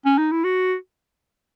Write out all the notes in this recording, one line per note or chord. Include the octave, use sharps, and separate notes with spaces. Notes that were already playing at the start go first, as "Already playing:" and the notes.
C#4
D#4
E4
F#4